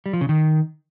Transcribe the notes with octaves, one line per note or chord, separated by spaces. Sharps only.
G3
F3
C#3
D#3